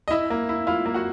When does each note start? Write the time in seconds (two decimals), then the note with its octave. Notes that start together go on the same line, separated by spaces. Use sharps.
0.08 D#5
0.11 E4 E5
0.30 A#3
0.49 E4
0.67 E4 F4 F5
0.86 A#3
0.94 F#4 F#5